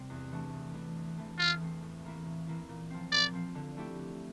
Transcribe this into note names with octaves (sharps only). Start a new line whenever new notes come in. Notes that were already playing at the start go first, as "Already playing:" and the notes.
Already playing: C3 G3 C4
E2
E3 A3 D4
E2
E3 A3 D4
E2
E3 A3 C4
E2 F4
E3 A3 C4
A2
E3 A#3 E4
A2
E3 A#3 E4
A#2
F3 C4
A#2 D5
F3 C4
D3
A3 E4 G4
D3